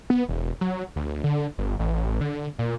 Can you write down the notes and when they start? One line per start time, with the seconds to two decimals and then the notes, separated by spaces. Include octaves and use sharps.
0.10 B3
0.29 E1
0.61 F#3
0.96 D2
1.24 D3
1.58 G1
1.79 A1
2.21 D3
2.59 A#2